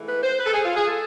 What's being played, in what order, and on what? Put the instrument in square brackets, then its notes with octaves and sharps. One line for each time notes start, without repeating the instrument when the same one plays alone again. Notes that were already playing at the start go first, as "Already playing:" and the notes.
Already playing: [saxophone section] G#2 E3 A3
B4
C5
B4
A4
G#4
F4
G#4
A4